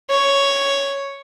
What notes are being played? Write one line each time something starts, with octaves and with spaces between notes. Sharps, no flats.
C#5